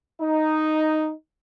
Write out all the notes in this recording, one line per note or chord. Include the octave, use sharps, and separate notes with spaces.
D#4